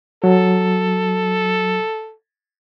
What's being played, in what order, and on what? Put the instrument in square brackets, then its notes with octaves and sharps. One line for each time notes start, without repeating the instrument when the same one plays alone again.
[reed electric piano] F#3 [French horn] A4